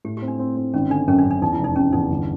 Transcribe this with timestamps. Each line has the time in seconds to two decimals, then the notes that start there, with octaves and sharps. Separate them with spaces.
0.05 A2 G4
0.17 G4
0.22 C4
0.28 D4
0.39 C4
0.56 C4
0.74 G#1 C#4
0.90 D3 D4
1.07 F#2 C#4
1.19 D4
1.25 F#2
1.31 D4
1.42 E2 D#4
1.53 E4
1.59 F1
1.64 D#4
1.76 C3 C#4
1.93 E2 D#4
2.10 G1